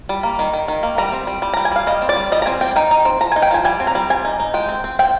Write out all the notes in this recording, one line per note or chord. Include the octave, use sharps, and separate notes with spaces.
G3
A#3
D#3
D#3
D#3
A#3
G3 A#5
C4
G3
G3
G3 A#5
G#5
G3 F5
G3 D#5
C4
D5
G3
G3 D#5
A#5
C4 G#5
C4 G5
D#4 G5
D#4
C4
F3 A#5
D#4 G#5
G5
F3 G#5
G3 G#5
C4
A#5
G3
C4 G#5
D#4
D#4
G#3 G5
C4
C4
C4 G5